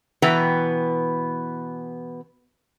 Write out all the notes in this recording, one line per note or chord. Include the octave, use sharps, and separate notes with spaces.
B2 E3 B3 B4 G5 A#5